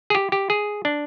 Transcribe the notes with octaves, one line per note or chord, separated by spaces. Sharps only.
G#4
G4
G4
G#4
D4